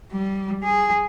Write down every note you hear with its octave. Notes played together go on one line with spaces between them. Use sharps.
G3
G#4